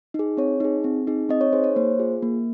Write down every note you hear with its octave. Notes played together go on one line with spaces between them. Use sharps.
D#4 G#4
C4 C#5
D#4 G#4
C4
D#4 G#4
C4 D#5
C#5
D#4 G#4 C5
C#5
A#3 C5
F4 G#4
A#3